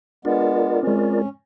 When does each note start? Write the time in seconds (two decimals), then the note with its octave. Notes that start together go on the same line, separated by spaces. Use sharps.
0.25 G#3 B3 D4 F4 A#4 D5
0.83 G#3 C4 C#4